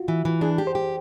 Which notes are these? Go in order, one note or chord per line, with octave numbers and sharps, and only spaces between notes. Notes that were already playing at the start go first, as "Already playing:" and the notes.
Already playing: F4 F#4
E3
E3
D4 G#4
G4
C5
G4